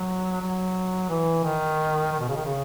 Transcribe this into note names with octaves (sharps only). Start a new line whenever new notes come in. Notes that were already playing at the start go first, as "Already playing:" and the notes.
Already playing: F#3
F#3
E3
D#3
D#3
B2
C#3
D#3
C#3